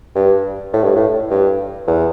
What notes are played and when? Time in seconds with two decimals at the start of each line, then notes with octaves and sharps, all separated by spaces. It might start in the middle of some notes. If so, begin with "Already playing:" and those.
0.15 G2
0.74 A2
0.84 G2
0.96 A2
1.30 G2
1.87 E2